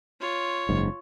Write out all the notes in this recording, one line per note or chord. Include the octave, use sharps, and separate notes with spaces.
F4 C#5
F#1 G#2